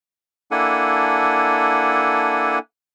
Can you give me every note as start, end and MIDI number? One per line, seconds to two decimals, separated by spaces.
0.51 2.59 58
0.51 2.59 62
0.51 2.59 64
0.51 2.59 69
0.51 2.59 78
0.51 2.59 80